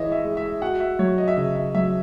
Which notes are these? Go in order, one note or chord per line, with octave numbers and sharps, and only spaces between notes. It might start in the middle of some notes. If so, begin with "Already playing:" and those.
Already playing: E3 G#3 C#5 D#5 E5
E5
G#3
E5
F#4 F#5
E5
F#3 C#5
D#5
E5
C#3 D#5
E5
F#3 E5